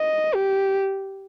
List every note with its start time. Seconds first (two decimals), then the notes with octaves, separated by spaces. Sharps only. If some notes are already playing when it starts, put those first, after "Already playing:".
Already playing: D#5
0.35 G4